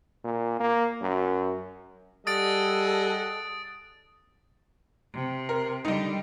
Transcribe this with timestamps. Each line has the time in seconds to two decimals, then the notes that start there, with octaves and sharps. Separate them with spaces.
0.24 A#2
0.60 A#3
1.02 F#2
2.27 G3 G#4 A4 D#5 F#5 D#6 A6 D7
5.13 C3
5.49 A#4
5.85 D3 G3 D#4 D#5